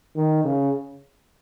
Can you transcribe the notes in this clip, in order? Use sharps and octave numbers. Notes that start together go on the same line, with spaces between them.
D#3
C#3